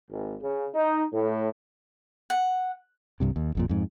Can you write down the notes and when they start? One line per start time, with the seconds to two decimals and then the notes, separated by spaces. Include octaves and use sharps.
0.10 G#1
0.41 C#3
0.74 D#4
1.13 A2
2.30 F#5
3.20 C2 G2 C3
3.36 D#2
3.55 G#1 F2 A#2
3.69 F2 G#2